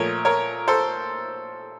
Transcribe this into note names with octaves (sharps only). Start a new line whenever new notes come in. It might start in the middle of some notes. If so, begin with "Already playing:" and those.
Already playing: A#2 F3 A3 A#4 C#5
A#4 C#5
A4 C5